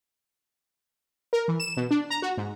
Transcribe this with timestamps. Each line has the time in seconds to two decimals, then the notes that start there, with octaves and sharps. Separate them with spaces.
1.33 A#4
1.48 E3
1.60 E7
1.77 B2
1.91 D4
2.10 A#5
2.22 F#4
2.37 G#2